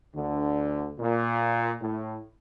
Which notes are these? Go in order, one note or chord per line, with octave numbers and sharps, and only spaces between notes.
D2 D3
A#2
A2